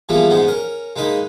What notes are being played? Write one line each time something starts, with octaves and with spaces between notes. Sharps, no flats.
E3 F3 G3 G#3 A#3 B3
G#2 G#3 B3 D#4
C#4 A#4
G#3 A#3 D#4 B4 D#5